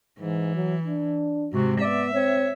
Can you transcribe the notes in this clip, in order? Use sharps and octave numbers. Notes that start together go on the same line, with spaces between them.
G#2 E3
F#3
D4
G#2 C3 F#4
B3 D5 E5
C4 C#5